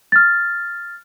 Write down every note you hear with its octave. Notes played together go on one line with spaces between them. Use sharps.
F6 A6